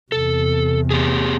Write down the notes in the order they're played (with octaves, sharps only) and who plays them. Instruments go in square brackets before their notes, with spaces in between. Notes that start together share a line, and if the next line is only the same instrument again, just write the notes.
[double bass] E2 C3 [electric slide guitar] A4
[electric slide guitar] B3 G4 G#4